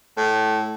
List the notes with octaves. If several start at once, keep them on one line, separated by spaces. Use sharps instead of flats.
A2